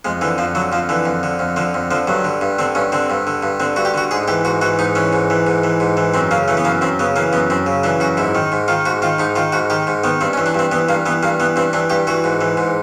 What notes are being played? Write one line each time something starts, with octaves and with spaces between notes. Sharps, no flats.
F2 G#3
D3 E3
F2 F3
D3 F#3
F2 F3
D3 E3
F2
D3
F2
D3 F3
F2
D3 F3
G2 F#3
D3
G2
D3 C4
G2 C#4
D3 C4
G2
D3
G2
D3 C4
G2 F#4
G4
D3 F#4
G#2 G#4
E3 G4
G#2 F#4
E3 F#4
G#2 D#4
E3 C#4
G#2
E3
G#2
E3
G#2
E3
F#2 C4
C#3 A#3
E3 A3
B3
F#2 A#3
F#2 C4
C#3 B3
E3 A#3
F#2 B3
F#2 C4
C#3
E3 D4
F#2 F#4
G#2 E4
D#3
G#2
D#3 F4
G#2 F#4
D#3 F4
G#2 D#4
D#3 F4
G#2 F#4
D#3 G4
G#2
D#3 B3
G2 C4
C#4
E3
D4
G2 C4
E3 B3
G2 A#3
E3 B3
G2 A#3
E3 B3
G2 C4
E3 D4
G2 G4
E3 F#4
G#2
E3
G#2